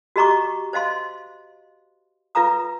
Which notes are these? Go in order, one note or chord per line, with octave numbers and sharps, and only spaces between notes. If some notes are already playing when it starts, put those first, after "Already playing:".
F#4 G4 D#5 A#5 C#6 D6
C5 D#5 F5 C6
F4 B4 F5 A#5 D#6